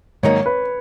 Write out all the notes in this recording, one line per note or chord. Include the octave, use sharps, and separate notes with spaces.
G#2 D#3 F#3 A#3 D#4 C#5
B4